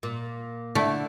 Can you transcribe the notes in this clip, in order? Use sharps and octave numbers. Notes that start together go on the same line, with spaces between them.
A#2
D3 A3 E4